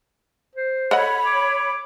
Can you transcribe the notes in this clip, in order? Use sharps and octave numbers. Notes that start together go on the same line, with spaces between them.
C5
A4 C#5 D#5 F#5 B5
D6